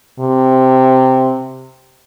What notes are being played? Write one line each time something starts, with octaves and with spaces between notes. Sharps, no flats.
C3